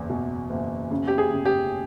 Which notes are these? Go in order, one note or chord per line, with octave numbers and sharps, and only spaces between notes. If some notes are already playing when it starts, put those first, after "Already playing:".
Already playing: F#1 E2
B2
F#1
C#3
G4
G#4
C#3
G4